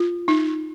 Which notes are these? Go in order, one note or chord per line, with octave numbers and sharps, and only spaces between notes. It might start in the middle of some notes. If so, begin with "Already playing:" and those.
Already playing: F4
D#4